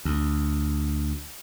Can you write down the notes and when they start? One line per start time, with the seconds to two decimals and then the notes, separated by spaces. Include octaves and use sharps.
0.05 D2